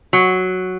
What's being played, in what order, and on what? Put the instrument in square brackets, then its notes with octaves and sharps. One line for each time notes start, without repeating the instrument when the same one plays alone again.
[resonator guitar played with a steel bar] F#3